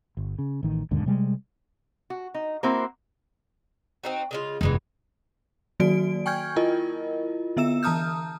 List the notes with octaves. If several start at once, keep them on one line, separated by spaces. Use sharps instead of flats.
G1
C#3
A1 D#3
E1 D#2 G#2 D3
C3 G3 G#3
F#4
D#4
A#3 C4 E4 F#4 C5
C4 D#4 F#4
C#3 G#3 F4
F1 G2 E3 G#3 D#4
D#3 F#3 A#3 F#4 D5 D7
G5 G#5 C#6 F6 G6 G#6
E4 F4 A#4 D#5
D3 B3 E5 E6 E7
E3 A5 A#5 D#6 F6 G6